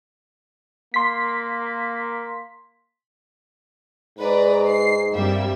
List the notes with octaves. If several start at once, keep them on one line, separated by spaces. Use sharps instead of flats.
A#3 C6 B6
G#2 B4 D5 A#5
C7
G2 G3 A#3 C4 E5